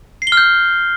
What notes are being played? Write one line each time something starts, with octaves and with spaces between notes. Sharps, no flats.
C7
G7
F6
G6